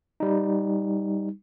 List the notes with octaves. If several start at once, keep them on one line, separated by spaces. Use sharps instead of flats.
G3 D#4